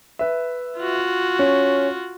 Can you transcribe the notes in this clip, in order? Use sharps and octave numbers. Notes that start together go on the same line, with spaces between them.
B4 E5
F4 F#4
C#4